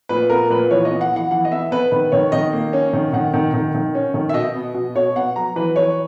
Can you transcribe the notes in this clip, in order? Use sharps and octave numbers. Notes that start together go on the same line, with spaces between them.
A#2 B4
B3 A#4
A#2 B4
E3 C#5
D#5
B3
F#5
E3 F#5
E3 F#5
D#5
B3 E5
B3 B4
D#3 B4
D#3 C#5
D#3 D#5
A#3
C#4
D#3
D#3 F#5
D#3
D#3
D#3
C#4
D#3
E5
B2 D#5
B3
B2
B2 C#5
B3 F#5
F#3 A#5
E3 B4
E3 C#5